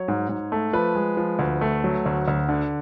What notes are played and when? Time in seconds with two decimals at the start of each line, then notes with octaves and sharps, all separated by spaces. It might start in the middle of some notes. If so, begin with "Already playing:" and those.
Already playing: F#3 C#5
0.08 G#2
0.29 G#2
0.52 A3
0.73 F3 B4
0.95 G#3
1.17 F3
1.39 D2
1.61 A3
1.84 F#3
2.06 D2
2.28 D2
2.49 D3